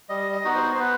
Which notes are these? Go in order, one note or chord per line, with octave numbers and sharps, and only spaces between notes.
G3 D#5
D#5
B3 D#4 F#4
C5
C5
B3 B4